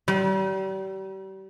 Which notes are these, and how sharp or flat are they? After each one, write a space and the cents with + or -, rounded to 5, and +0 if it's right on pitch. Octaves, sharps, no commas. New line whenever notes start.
G3 -35